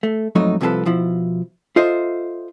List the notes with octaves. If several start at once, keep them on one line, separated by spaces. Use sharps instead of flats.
A3
F2 G#2 F#3 A3 D#4
C2 C3 F3 G#4 A4 B4
B2 F3 E4
F4 A4 C5 D#5 E5